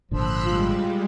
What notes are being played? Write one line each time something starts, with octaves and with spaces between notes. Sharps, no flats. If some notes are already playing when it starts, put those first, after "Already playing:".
G#1 A#2 D3 F3 B5 E6 F#6
G3 G#3 F4